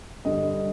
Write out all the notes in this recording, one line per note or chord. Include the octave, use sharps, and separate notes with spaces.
G2 D3 G3 D#5